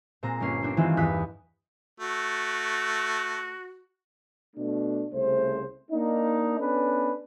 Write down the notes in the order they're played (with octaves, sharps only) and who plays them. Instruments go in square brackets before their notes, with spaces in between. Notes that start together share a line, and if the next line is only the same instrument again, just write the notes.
[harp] A#2 G#3 C4 A#5 A#6
G1 A#3 C#4 C7
A#3 C4 D4
D#3 E3 G#3 C4 F4
E2 G2 D#6 F#6 B6
[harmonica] A3 [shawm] F#4
[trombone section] B2 A3 D4
C2 C#3 A3 C5
A#3 D4 D#4
B3 C#4 D4 A4 B4